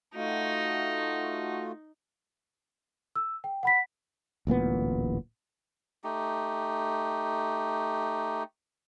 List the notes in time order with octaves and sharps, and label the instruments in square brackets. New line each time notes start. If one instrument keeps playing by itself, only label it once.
[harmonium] A3 F4 F#4 [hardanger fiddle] D#4
[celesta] E6
G5
F#5 B5 B6
[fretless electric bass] D1 A1 A#2 B3
[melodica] A3 D#4 G4